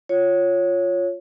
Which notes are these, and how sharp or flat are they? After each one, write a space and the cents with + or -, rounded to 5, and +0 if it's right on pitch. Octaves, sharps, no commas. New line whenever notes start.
F4 +0 C#5 +0